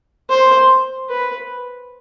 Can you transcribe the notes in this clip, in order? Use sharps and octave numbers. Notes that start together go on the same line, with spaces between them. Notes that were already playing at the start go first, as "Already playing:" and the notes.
C5
B4